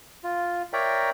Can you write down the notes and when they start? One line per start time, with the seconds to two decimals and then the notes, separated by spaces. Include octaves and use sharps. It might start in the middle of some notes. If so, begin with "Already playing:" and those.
0.24 F4
0.73 A#4 C#5 D5 E5 G5 A#5